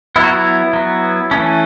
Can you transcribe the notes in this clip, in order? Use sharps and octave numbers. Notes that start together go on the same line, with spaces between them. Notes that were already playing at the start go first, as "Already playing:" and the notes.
F#3 B3 E4
F#4
E4
F#3 B3
E3 A3 C#4